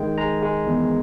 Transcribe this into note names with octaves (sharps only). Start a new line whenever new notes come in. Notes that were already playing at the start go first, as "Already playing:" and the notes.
Already playing: D#3 G#3 G5
G#3 A#5
G#3
E2